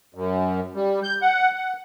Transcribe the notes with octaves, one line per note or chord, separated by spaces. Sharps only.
F#2
G3
G6
F#5
F#5